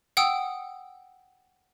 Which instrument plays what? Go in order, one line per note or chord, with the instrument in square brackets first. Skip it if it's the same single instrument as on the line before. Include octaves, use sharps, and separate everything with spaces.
[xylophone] F#5 G5 D#6 E6